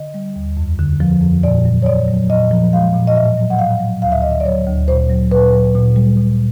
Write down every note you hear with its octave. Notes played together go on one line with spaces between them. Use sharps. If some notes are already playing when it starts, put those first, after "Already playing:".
Already playing: D3 D#5
G3
D#2
F2
D3
F3
F2
A#2 D5
F#3
C#5
A#2 D5
F#3
A#2 D#5
F3
G#3 F5
A#2
D#5
A2 E5
F#3
F#5
A2 F5
F#3
D2 F5
E5
D3 D#5
E5
D5
F#3 C#5
D2
A#2 C5
F#3
A#2 B4
F#3
A#2
G3
A#2